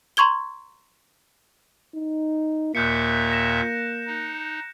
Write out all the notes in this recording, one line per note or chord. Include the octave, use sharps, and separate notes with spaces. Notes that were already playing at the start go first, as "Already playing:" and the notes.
A#5 C6 C#6 G#6 G7
D#4
D#2 A#2 A#3 E5 F#6 G6 C#7
A#6 E7
D#4